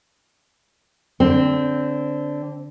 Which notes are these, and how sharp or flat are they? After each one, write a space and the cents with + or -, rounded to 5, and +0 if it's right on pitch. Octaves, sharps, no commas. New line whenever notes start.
D3 -10 C4 +0